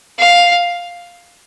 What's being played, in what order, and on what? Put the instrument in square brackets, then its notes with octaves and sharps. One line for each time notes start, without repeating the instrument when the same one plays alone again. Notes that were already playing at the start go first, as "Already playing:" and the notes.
[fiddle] F5